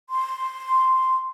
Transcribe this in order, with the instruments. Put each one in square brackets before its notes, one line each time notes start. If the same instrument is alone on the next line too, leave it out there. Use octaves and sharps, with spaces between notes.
[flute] C6